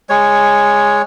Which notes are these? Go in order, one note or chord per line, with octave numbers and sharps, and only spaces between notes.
G#3 C#5